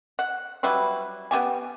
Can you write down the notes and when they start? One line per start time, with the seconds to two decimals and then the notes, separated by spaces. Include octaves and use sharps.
0.19 F#5
0.63 F#3 G3 E4 B4
1.31 B3 E4 G4 G#5